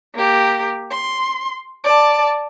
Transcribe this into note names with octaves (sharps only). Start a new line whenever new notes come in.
A#3 G4
C6
D5 A5